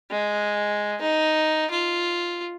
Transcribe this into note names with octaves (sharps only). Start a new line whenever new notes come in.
G#3
D#4
F4